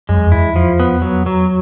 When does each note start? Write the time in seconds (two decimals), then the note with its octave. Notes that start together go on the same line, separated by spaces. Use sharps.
0.09 F#2 G#3
0.17 F2
0.26 E2
0.32 F2 E4
0.56 F3
0.80 B3
1.02 F#3
1.26 F#3